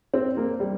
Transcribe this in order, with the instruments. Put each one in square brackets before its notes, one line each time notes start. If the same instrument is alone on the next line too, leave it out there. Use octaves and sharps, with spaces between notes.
[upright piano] C4
A#3
G3